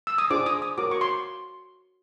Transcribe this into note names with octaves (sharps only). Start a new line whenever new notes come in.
E6
D#6
D4 F4 G#4 C5 D6
D#6
D#6
F#4 A#4 C#5 D6
C#6
C6